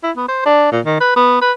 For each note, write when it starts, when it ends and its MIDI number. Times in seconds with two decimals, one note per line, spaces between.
0.04 0.11 64
0.16 0.26 59
0.28 0.45 72
0.46 0.68 62
0.72 0.80 46
0.85 0.98 51
1.01 1.14 71
1.16 1.40 59
1.41 1.52 71